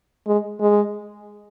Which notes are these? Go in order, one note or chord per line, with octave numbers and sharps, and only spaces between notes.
G#3
G#3